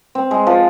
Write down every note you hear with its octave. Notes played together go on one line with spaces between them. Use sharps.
C4
G#3
F3